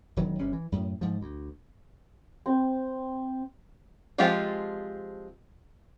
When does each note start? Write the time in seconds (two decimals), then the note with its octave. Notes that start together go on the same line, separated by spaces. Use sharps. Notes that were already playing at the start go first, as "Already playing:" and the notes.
0.16 E1 D#3 F#3
0.38 G1 C3 C#4
0.53 E3
0.72 F#2 A2
1.01 G#2 F3
1.21 D2
2.46 C4
4.18 F3 G#3 C4 F4 G4